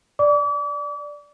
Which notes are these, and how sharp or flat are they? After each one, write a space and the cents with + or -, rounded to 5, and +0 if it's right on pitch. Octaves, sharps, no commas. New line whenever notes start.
D5 +0 D6 -40